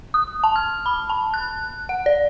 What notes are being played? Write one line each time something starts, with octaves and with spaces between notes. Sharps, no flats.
D#6
A5
F6
B5
A5
F#6
F#5
D5